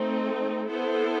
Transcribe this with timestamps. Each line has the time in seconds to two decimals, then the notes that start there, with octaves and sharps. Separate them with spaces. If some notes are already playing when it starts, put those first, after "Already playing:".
Already playing: A3 C4 D#4
0.68 B3 E4 A4 C5